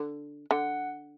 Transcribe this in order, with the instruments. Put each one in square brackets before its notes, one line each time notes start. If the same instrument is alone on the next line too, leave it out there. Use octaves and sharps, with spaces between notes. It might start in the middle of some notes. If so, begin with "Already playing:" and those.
Already playing: [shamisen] D3
[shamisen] D3 [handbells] F#5